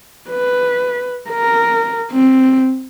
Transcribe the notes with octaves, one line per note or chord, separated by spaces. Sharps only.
B4
A#4
C4